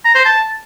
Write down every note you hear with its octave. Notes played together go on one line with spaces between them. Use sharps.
A#5
C5
A5